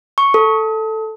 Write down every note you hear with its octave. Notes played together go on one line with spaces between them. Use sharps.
C#6
A4